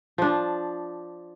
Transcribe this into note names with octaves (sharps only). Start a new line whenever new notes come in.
F3 D4